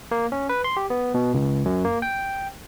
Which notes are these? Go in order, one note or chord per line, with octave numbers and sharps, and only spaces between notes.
A#3
C#4
B4
C6
G4
B3
B2
C#2
F#2
A#3
G5